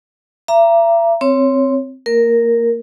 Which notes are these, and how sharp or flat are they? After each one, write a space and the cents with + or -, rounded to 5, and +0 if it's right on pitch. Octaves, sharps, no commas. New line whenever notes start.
E5 +40 A#5 +0 D6 +0
C4 +0 C#5 +0
A#3 -20 A#4 +0